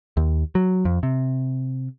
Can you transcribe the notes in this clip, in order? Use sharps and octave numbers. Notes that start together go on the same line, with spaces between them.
D#2
F#3
F2
C3